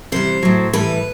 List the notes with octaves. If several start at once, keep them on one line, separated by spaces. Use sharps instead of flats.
C3 E3 G3 C5
A2 F#3
A2 E3 G3 B4